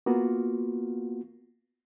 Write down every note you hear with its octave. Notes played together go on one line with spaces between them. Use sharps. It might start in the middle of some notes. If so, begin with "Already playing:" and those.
A#3 B3 F4 F#4